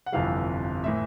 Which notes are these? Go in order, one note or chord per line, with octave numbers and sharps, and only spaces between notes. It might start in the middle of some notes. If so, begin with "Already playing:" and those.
F#5
G1 F2 C3 E3 G3 F5
A2 E3 E5